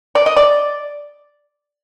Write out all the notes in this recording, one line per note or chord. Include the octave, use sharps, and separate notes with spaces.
D5
D#5
D5